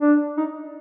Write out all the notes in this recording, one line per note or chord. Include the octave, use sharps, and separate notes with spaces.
D4
D#4